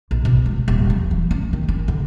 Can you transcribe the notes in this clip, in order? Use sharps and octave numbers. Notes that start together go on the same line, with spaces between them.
A#1
B2
C#2
D#1
F3
E3
C#4
D#3
C#4
D3